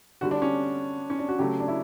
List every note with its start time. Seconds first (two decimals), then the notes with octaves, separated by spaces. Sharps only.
0.21 D3 G3 F#4
0.31 D4
0.42 C#4
1.10 C#4
1.19 D4
1.29 F#4
1.39 C#3 F#3 A3 G4
1.60 D4
1.68 E4